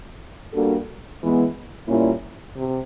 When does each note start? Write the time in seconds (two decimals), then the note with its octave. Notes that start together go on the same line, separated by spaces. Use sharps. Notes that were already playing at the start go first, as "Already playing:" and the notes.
0.54 G3 A#3 D4 F#4 A4
1.21 E3 G#3 B3
1.88 A#2 G3 A#3 C#4 E4
2.55 C3